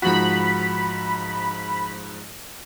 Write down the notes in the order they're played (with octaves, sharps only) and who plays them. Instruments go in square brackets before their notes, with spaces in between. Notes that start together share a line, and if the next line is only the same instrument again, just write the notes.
[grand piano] G#2 F3 F#4 [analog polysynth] B5